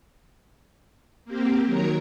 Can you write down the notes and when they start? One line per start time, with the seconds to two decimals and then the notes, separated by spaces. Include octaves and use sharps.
1.25 A#3 C4 G4
1.65 D#3 F#3 A#4 C#5 A#5